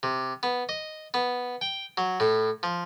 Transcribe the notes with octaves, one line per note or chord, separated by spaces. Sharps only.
C3
B3
D#5
B3
G5
F#3
A2
F3